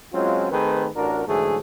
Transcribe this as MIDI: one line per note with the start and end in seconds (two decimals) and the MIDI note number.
0.13 0.47 54
0.13 0.47 56
0.13 0.47 60
0.13 0.47 61
0.13 0.47 65
0.51 0.88 51
0.51 0.88 57
0.51 0.88 60
0.51 0.88 68
0.51 0.88 71
0.96 1.23 33
0.96 1.23 62
0.96 1.23 66
0.96 1.23 70
1.27 1.57 44
1.27 1.57 50
1.27 1.57 52
1.27 1.57 54
1.27 1.57 57
1.27 1.57 68